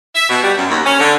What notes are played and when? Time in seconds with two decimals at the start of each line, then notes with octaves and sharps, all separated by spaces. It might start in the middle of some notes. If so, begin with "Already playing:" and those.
0.15 E5
0.30 B2
0.43 G3
0.58 F#2
0.70 D#2
0.86 C#4
1.00 D3